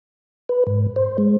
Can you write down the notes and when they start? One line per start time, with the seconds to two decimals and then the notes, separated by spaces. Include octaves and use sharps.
0.49 B4
0.67 G#2
0.96 C5
1.18 G#3